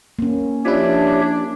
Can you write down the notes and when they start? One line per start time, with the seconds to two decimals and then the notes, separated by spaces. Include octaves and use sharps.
0.19 A#3 C#4
0.65 F3 D4 E4 G4 C#5 E5